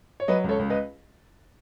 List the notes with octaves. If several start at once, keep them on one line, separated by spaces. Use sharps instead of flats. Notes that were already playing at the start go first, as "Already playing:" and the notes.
C#5
F#3 B4 D#5
C#2 A4 C#5
C#2
B4 D#5